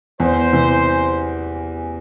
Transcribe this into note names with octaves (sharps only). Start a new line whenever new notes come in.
E2 C5
C3 E3